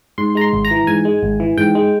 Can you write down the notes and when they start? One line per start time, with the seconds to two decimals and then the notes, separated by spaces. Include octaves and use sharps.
0.18 G#2 C6
0.35 G#3 A#5
0.41 C6
0.53 G#1
0.65 A#5
0.71 E3
0.87 G#2 G#5
1.05 G#3
1.23 G#1
1.40 E3
1.57 G#2 G5
1.75 G#3